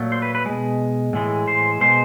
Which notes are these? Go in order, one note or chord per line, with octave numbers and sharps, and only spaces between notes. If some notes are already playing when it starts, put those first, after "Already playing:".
Already playing: A#2 F#3 A3
C5
B4
B4
B2 G#3
A2 E3 G#3
C5
B2 G#3 C5